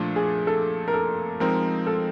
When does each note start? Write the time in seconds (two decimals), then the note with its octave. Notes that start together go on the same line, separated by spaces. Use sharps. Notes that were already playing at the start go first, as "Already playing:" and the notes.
Already playing: A#2 F3 A3 D4
0.16 G#4
0.47 A4
0.88 A#4
0.94 A4
1.40 F3 G#3 C4 D#4 A#4
1.87 A4